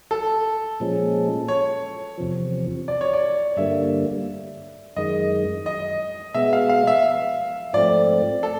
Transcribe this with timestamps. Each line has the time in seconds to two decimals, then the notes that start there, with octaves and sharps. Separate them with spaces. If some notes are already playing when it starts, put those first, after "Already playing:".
0.11 A4
0.80 A#2 F3 G#3 C#4
1.48 C#5
2.18 E2 C3 F3
2.88 D5
3.01 C#5
3.13 D5
3.57 G2 D3 G3 A#3 E5
4.96 F#2 D#3 G#3 D#5
5.66 D#5
6.34 B2 G#3 B3 E5
6.53 F5
6.69 F5
6.87 E5
7.73 G#2 F3 A3 C4 D5
8.43 A4